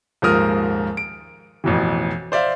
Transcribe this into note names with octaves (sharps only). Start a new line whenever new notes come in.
D#1 G#2 F3 A#4 D#6 F6
D7
A1 F2 B2 E3
C5 D5 E5 F5